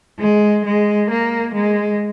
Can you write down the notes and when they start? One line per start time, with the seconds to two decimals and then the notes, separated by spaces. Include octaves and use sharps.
0.19 G#3
0.65 G#3
1.10 A#3
1.54 G#3